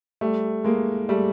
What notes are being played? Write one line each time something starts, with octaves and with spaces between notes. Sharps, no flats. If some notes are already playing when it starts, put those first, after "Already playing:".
G3 A3
G#3 A#3
G3 A3